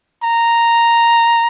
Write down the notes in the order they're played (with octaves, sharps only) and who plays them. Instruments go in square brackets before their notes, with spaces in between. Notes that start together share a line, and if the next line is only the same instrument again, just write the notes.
[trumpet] A#5